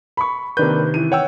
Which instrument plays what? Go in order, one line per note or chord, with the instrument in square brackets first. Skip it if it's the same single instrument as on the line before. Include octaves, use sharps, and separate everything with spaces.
[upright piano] B5 C#6
[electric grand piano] C3 D#3 G6 [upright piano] A#3 D4 B4
[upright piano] E3 D#7
[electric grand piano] C#5 G5 E6 [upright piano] F#5